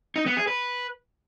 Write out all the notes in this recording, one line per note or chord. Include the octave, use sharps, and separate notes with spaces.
D#4
B3
G#4
B4